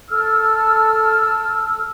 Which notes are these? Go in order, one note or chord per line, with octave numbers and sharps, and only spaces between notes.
A4 E6 F6